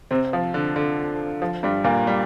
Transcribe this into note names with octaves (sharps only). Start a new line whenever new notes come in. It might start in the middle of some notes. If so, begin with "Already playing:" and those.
C3 C4
F3
D3
D3
F3
G2 G3
A#2 A#3
G3